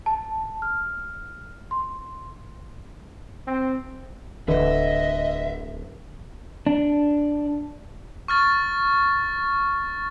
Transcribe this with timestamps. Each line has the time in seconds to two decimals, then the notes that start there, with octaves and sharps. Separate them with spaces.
0.06 A5
0.62 F6
1.71 C6
3.47 C4
4.48 D1 D3 B4 D#5 E5
6.67 D4
8.28 C#6 F6 A6